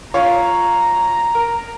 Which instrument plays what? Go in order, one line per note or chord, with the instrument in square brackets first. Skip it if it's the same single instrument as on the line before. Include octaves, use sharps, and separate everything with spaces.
[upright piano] F4 C#5 F5 [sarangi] A#5
[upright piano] A#4